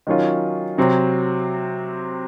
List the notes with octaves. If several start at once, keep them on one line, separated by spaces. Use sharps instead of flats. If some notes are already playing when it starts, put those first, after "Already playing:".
D#3 F#3 C#4 F4
C3 F#3 C4